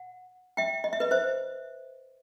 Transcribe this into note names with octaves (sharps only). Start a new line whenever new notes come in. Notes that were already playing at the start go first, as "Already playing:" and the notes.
Already playing: F#5
E5 G5
D#5
E5
B4 D#5
C5 E5